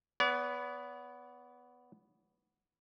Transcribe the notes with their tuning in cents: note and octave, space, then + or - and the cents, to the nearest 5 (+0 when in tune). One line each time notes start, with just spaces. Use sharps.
B3 +0 D5 -45